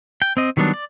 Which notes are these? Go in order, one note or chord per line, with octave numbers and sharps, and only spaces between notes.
G5
C4 D#5
D#3 F#3 G3 B3 D4
D5